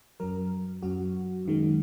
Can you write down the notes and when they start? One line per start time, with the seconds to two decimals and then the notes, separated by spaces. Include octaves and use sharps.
0.20 F#2 F#3 A#4
0.82 F#2 F#3 F#4
1.45 F#2 D#3 G#3